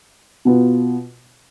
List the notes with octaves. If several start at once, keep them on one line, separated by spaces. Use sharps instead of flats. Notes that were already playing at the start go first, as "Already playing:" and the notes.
B2 B3 F4